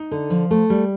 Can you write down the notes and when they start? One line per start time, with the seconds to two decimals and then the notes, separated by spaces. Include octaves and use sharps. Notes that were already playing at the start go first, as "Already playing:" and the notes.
Already playing: D#4
0.11 D3
0.30 F3
0.51 A3
0.70 G3